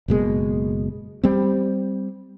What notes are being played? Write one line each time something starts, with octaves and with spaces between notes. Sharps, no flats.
F#1 B2 G#3 A#3
G3 C4